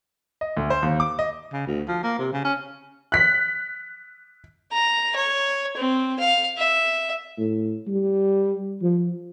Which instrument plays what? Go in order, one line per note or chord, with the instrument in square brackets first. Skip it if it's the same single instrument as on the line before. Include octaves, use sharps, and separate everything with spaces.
[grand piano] D#5
D2
C5
D#2
D6
D#5
[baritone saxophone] C#3
D2
F3
A#3
C3
C#3
C#4
[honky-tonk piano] F#6 B6
[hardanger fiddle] A#5
C#5
C4
F5
E5
[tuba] A2
G3
F3